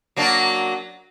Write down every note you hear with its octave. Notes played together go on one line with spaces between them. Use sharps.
F#3 A#3 D4